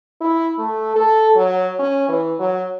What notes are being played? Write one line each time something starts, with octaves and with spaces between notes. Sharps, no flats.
E4
A3
A4
F#3
C#4
E3
F#3